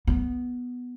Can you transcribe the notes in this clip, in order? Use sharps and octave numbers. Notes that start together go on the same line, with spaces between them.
B3